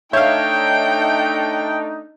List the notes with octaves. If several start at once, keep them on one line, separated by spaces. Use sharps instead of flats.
A3 D4 D#4 C#5 E5 F5 G5 G6